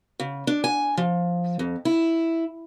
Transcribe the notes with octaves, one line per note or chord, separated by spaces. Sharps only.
C#3
D4
G#5
F3
F2
E4